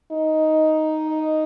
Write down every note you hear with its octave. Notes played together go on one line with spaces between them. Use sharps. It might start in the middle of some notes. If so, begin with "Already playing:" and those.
D#4